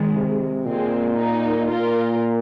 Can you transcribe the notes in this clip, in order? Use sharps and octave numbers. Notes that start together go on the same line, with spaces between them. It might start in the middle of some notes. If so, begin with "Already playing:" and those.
Already playing: D#3 G#3
C3
A#2 G#3 C4
A#3 D#4
A#2 F4 A#4